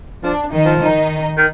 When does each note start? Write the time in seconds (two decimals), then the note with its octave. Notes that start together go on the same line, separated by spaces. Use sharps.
0.24 F3 D4
0.52 D#3 D#4
0.66 F3
0.80 D#3 D#4
1.38 D#3